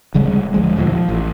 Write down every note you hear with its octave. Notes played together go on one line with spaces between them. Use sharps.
D1 C#3 G3 G#3
D2 F3 G#3
D#1 D2 B2 F3
F3
A1